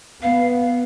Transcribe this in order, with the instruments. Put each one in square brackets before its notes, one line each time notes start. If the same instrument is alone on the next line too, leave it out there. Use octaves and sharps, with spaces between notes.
[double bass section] B3 [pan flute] F5